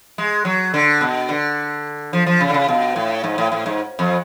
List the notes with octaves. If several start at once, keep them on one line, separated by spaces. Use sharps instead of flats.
G#3
F#3
D3
B2
D3
F3
F3
C#3
D3
C#3
B2
A2
G#2
A2
A2
G#2
F2